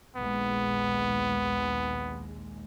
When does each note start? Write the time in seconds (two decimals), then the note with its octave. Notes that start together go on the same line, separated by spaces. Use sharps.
0.16 A#1 D#2 G#3 B3